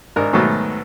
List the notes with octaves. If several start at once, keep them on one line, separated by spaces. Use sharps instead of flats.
G#1 D4 A#4
G#2 B2 D#3 F#3 A3